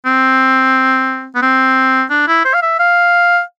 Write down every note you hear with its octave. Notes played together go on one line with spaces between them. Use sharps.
C4
B3
C4
D4
E4
C5
F5
E5
F5